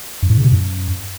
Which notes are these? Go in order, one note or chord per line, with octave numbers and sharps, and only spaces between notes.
F#2
A2
C#3
B2
F#2